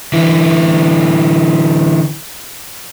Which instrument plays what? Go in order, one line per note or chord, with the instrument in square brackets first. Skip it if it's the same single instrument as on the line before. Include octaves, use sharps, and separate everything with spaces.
[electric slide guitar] D3 E3 E4